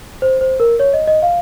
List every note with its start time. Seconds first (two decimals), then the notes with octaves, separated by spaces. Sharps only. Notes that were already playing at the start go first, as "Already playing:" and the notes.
0.22 C5
0.41 C5
0.60 A#4
0.80 C#5
0.93 D#5
1.07 D#5
1.22 F5